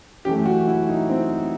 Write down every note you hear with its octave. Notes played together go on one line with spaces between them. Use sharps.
F#2 E3 A3 G4
F#4
E4
D#4
C4